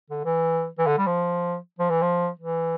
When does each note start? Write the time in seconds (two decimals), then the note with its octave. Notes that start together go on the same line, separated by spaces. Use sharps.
0.10 D3
0.25 E3
0.78 E3
0.86 D3
0.98 G3
1.06 F3
1.78 F3
1.90 E3
2.02 F3
2.39 E3